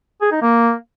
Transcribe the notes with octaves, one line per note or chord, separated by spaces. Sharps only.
G#4
D#4
A#3